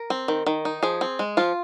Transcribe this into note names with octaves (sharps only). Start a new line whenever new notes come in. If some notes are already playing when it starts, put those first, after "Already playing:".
Already playing: A#4
C4
D#3
D#3
D#4
F3 G#4
C4
G#3
F3 F4